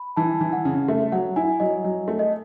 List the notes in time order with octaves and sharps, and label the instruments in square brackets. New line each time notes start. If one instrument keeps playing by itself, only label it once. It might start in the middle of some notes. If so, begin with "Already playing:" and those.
Already playing: [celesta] B5
[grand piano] E3 [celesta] A5
[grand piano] E3
[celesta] F#5
[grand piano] C#3
[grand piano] A3 [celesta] E5
[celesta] E5
[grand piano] F#3 [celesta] F#5
[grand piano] E4 [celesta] G#5
[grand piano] F#3 [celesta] D#5
[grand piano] F#3
A3
[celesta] D#5